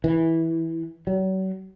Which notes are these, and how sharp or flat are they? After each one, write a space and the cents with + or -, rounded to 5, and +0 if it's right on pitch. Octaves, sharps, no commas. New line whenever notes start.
E3 -10
F#3 +40